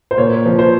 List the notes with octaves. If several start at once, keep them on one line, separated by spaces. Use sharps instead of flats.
C5
A#2 C#5
F3
C5